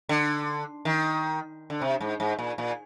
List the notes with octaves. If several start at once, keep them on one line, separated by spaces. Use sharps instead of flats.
D3
D#3
D3
C3
G#2
G#2
A#2
A#2